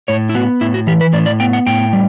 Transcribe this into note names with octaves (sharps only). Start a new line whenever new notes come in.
A2 C#5
E4
B3 F#4
A2 E4
F#4
E3 G4
B4
A2 D5
D5
B3 G5
F#5
A2 G5
G3